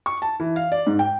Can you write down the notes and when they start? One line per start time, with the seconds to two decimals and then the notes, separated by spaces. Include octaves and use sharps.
0.06 C#6
0.22 A5
0.40 E3
0.56 F5
0.72 D5
0.87 G#2
0.99 G5